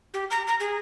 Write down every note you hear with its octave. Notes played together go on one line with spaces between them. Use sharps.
G4
A#5
A#5
G#4